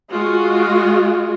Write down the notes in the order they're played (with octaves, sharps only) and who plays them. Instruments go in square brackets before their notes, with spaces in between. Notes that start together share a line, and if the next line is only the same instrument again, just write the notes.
[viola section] G#3 F4 F#4